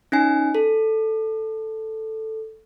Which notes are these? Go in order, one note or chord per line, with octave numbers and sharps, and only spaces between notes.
C#4 D#4 G#5
A4